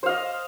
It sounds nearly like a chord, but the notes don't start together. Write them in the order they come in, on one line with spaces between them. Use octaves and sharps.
C5 F5 D#5